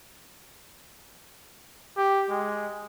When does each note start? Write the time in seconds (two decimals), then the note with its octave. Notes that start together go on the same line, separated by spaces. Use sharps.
1.97 G4
2.30 G#3